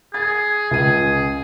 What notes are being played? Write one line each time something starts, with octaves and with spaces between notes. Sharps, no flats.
G#4 A6
C#2 D#7